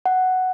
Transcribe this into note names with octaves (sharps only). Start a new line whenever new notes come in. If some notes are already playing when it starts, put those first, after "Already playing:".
F#5